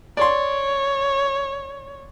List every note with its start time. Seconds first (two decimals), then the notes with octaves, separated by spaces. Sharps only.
0.17 C#5 D5 C6